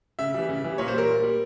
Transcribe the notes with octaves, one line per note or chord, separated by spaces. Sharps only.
C#3 E5
E3 G3
C#3
E3 G3
A#2 C#5
C5
G3 A#4
A#2
G3